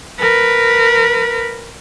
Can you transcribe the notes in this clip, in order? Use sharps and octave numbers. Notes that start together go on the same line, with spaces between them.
A#4 B4